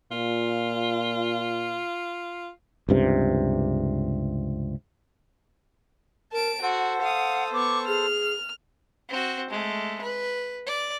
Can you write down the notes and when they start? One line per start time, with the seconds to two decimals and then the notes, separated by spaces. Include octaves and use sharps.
0.12 A#2 F4
2.89 C#2 G2 C3
6.32 A#4 A5 D7
6.62 F#4 A4 C5 F#5
7.02 F5 D#6
7.53 B3 C#6 D6
7.87 G#4 F6
9.09 C4 F#4
9.50 G#3 A3
10.02 B4
10.67 D5